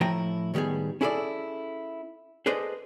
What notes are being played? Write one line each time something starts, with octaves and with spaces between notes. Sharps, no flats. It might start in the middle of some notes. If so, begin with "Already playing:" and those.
A2 F3 E4 G5 A#5
A2 D#3 G3 B3 G#4
C#4 E4 G#4 A4 B4 D5
G#4 A4 B4 C5 D5 D#5